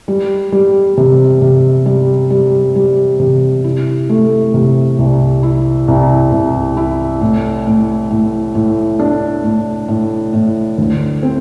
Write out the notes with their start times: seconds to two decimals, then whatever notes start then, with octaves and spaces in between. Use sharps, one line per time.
0.08 G3
0.52 G3
0.97 C3
1.42 C3
1.86 G3
2.30 G3
2.75 G3
3.19 C3
3.64 E4
4.09 A3
4.54 C3
4.98 C2
5.43 E4
5.88 C2
6.32 C2
6.77 E4
7.21 A2
7.67 A2
8.10 A2
8.55 A2
8.99 D4
9.44 A2
9.88 A2
10.33 A2
10.78 D2
11.23 C4